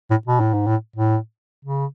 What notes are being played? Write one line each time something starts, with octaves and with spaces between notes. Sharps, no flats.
A2
B2
A2
G#2
A2
A2
C#3